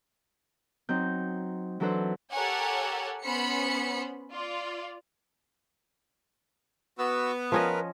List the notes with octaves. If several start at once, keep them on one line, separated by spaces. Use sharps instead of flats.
F#3 C4 D#4 G6
E3 F#3 D4 A4 B4 C5
G4 A4 A#4 C#5 F#5 G#5
B3 C#4 C5 B5 B6 C#7
F4 D5
B3 F#4 E6
F3 C#4 A#4 B4 D#5